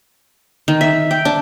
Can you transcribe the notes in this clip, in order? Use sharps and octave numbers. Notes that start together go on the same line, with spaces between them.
D#3
E5
G5
D4